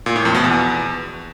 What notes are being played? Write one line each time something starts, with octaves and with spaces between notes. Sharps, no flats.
A#2
A2
F2
B2
E2